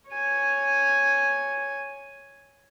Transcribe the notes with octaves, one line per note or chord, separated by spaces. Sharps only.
C#5 G#5